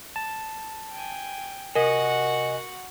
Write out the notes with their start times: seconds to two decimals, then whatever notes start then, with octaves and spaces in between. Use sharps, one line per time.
0.16 A5
0.92 G5 G#5
1.75 C3 F#4 A#4 D#5 F#5 G#5